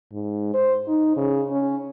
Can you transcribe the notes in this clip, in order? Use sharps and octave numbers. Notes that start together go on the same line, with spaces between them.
G#2
C5
D#4
C#3
C#4